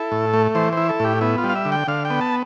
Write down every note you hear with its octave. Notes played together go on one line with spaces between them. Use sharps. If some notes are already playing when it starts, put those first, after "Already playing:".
Already playing: E4 A4
A2
A3
E3 C5
E4 C5
A4
A2 G4
B3 E4
F4
G3
F5
E5
D3
G5
D3 F5
G5
B3
A5